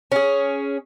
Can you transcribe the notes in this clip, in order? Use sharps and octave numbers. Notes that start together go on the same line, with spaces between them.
C#4 G#4